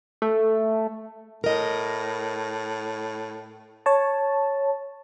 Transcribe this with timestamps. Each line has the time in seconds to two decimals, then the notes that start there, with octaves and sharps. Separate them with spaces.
0.22 A3
1.44 A2 A#4 D#5
3.86 C#5 A5